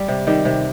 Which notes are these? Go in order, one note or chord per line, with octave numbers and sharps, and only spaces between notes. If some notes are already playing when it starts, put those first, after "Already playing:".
Already playing: G3
C3
D#3 G3
C3